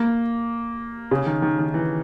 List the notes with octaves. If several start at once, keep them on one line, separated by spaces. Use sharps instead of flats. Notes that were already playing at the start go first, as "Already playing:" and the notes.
Already playing: A#3
C#3
D#3
D#3
D#3
E3